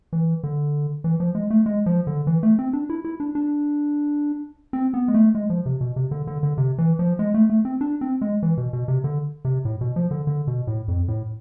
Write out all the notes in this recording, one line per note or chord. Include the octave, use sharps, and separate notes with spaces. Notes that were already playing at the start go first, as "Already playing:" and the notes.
E3
D3
E3
F3
G#3
A3
G#3
F3
D3
E3
A3
C4
D4
E4
E4
D4
D4
C4
B3
G#3
A3
G#3
F3
C3
B2
C3
D3
D3
D3
C3
E3
F3
G#3
A3
A3
C4
D4
C4
G#3
E3
B2
B2
C3
D3
C3
A2
B2
F3
D3
D3
B2
A2
F2
A2